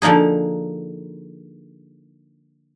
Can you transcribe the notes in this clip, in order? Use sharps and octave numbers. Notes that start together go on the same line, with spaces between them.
D3 F3 A#3 D#4 G#4